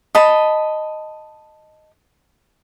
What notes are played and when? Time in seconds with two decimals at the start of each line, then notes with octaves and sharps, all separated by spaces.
0.15 D#5 A5 B5